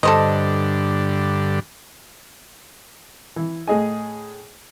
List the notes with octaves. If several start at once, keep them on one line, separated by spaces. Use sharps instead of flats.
G2 D3 A4 C5 D#5
E3
A2 G#4 D#5 G#5